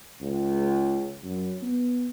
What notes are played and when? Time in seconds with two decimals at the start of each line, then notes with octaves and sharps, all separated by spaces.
0.21 C#2
1.24 F#2
1.62 B3